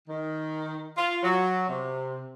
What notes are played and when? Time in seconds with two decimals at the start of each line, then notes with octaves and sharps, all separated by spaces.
0.08 D#3
0.98 F4
1.23 F#3
1.69 C3